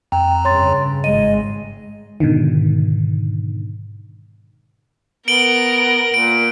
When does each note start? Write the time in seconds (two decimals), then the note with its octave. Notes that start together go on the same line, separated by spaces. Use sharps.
0.12 F2 G5 A#5
0.45 G2 C#3 C#5 C6 A6
1.04 G#1 G#2 G#3 D#5 D#7
2.20 G#2 B2 D3 D#3
5.28 B3 A#4 D7 F#7 G7
6.14 A#2 D7